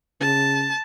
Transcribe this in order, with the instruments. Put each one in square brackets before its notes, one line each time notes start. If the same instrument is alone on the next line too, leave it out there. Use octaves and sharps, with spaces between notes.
[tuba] C#3 [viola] A5